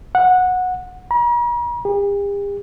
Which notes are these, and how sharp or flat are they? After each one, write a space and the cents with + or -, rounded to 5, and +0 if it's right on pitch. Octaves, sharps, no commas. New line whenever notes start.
F#5 -15
A#5 +45
G4 +45